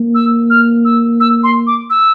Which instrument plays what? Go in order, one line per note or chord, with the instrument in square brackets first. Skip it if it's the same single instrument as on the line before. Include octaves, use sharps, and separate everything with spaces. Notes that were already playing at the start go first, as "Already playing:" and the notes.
Already playing: [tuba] A#3
[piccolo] E6
F6
E6
E6
C6
D6
E6